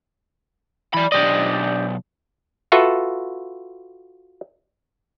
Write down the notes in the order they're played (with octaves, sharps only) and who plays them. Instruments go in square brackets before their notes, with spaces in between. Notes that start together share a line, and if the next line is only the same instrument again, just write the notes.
[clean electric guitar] E3 [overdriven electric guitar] D5 B5
[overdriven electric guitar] B1 D5 [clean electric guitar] D4 G4 D#5
[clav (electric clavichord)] F4 F#4 A4 B4 E5